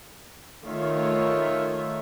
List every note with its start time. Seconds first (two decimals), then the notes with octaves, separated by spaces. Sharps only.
0.65 D#3 A3 F4 C#5 E5